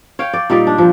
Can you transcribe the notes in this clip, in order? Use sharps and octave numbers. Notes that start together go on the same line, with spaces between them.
C#5 F5 G5
D5
A#2 G3 D#4 D5
D4
A#2 F3 C5